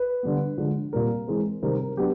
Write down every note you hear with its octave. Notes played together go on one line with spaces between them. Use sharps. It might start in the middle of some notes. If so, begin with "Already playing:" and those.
Already playing: B4
D3 G3 B3
D3 F3 G#3
A#2 G3 C4 A#4
E3 G#3 C4
C3 D#3 G3 C4 A#4
A#4
F#3 B3 D4 G4